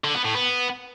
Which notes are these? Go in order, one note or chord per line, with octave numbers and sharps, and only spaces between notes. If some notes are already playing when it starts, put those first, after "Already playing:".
D3
B3
A2
B3